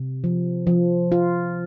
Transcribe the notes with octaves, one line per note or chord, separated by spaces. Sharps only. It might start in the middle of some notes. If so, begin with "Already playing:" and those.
Already playing: C3
F3
F3
F4